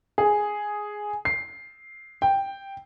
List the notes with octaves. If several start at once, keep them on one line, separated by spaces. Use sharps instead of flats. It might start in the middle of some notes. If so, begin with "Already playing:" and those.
G#4
C7
G5